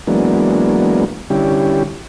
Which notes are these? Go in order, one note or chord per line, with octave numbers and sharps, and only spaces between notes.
E3 F#3 G#3 A#3 B3 D4
D3 G3 C#4 E4 G4